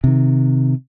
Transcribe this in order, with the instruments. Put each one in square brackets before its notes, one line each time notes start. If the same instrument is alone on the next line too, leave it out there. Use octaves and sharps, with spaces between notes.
[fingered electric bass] C3 D#3